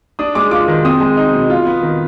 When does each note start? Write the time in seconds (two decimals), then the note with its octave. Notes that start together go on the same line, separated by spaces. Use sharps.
0.19 D4 D#6
0.35 G#3 D6
0.51 F4 D6
0.68 D#3
0.85 C4 D#6
1.00 G#3
1.17 D#4
1.33 B2
1.50 F4
1.67 B3
1.83 D#3